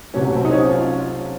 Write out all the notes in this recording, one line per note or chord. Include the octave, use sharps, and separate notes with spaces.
C2 C3 F#3 A3 C#4
C4
D#4
C#4
F4